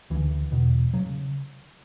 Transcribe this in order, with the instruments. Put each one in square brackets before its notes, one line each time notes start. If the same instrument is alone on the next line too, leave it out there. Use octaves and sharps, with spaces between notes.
[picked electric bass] D2 D3 E3
E2 B2
C#3 F#3